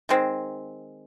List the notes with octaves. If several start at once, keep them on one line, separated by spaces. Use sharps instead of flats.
D#3 G#3 C4